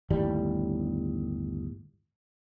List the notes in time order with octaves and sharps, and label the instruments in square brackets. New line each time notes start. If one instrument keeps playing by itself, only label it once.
[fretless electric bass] G1 D#2 A2 G3